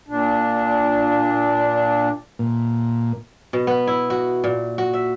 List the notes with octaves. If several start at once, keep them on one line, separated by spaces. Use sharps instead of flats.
A#2 D4
A#2
B2
B3
E4
F#4
A#2
F#4
E5